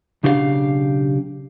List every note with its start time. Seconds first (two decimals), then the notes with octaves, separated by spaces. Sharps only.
0.23 B1 C#3 D4 G4 A4 F5